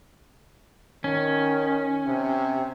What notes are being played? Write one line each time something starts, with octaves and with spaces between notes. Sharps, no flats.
D#3 C#4
C3